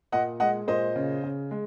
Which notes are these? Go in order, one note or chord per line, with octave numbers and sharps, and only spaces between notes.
A#2 D#5 F#5
G#3 D#5 F#5
A#2 C5 D#5
C#3
C#3
G#3